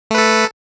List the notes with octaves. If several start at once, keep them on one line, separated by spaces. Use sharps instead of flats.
A3 A4 B4